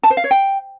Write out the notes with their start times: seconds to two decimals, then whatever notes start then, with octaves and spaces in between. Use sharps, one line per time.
0.03 A5
0.10 C5
0.17 F5
0.24 C#5
0.31 G5